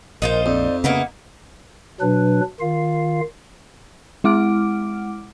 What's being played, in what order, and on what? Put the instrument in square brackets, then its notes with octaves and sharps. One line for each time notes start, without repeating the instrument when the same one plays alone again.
[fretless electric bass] A#1 [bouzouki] D#4 F4 C5 [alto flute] A#4
[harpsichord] F2 [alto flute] D5
[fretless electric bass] C#3 B3 [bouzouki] A#3 D#4 E4 [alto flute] F#5
[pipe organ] B2 F#3 D4 B4
D#3 F4 F5
[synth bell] G#3 E4 F#5 D6 F6 D7